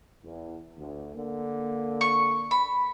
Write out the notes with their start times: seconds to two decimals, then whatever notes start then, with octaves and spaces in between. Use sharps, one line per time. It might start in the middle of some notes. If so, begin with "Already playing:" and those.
0.23 E2
0.75 D2
1.13 D3 A#3
2.01 C#6
2.51 B5